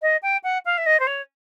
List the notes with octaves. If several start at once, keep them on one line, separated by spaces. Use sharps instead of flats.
D#5
G5
F#5
F5
E5
D#5
C5
C#5